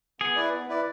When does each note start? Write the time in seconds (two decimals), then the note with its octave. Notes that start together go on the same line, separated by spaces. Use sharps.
0.20 B3 G#4
0.36 E4 B4 D5
0.53 B3
0.69 E4 B4 D5